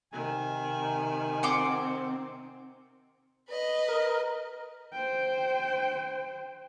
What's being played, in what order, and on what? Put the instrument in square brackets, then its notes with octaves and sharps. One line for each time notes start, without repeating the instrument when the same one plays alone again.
[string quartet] C3 D#3 [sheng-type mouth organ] G#5
[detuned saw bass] C4 [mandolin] F#5 C6 D6
[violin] B4 D#5
[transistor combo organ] A#4
[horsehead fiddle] C5 G5